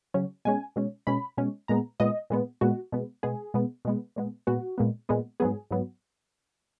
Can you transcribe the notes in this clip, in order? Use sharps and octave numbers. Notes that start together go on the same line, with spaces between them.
C#3 F#3 C#4
B2 G#3 C#4 G#5
B2 G#3 C#4
B2 G#3 C#4 B5
B2 G#3 C#4
A#2 G#3 B3 A#5
A#2 G#3 B3 D#5
A#2 G#3 B3
A#2 G#3 B3 F#4
B2 G#3 B3
B2 G#3 B3 G#4
B2 G#3 B3
B2 G#3 B3
A#2 G#3 B3
A#2 G#3 B3 F#4
A#2 G#3 B3
A#2 G#3 B3
G#2 F#3 B3 G#4
G#2 F#3 B3